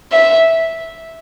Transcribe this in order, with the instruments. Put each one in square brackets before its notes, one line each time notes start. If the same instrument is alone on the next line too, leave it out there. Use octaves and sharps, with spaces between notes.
[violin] E5